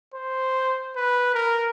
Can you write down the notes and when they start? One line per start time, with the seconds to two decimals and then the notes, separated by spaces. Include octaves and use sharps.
0.14 C5
0.96 B4
1.34 A#4